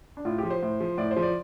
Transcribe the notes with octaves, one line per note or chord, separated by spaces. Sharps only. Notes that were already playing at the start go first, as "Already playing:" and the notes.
D4
A2 F4
G4
F3
C5
A2
F3
A2 D5
C5
F3
D5